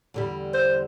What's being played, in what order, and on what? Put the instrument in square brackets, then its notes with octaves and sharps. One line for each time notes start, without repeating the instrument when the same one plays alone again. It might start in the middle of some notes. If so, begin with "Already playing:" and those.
[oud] E2 D3 G3
[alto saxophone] C5